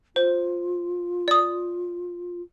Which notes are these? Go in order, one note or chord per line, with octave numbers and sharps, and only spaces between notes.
F4 C5
D5 D#6